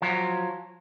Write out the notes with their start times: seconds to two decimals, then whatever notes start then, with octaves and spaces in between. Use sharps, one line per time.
0.02 F3 F#3